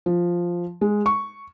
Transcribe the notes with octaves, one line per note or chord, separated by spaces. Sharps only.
F3
G#3
C#6